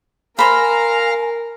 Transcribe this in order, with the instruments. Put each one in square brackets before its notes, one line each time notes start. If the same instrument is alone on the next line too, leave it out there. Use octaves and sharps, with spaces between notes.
[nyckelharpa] A#4 [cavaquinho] C5 B5 [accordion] F5 A#5 F6 [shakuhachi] G#5